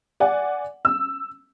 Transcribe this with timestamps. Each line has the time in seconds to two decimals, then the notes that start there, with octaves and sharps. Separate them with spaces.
0.20 D5 F#5 G#5
0.85 E6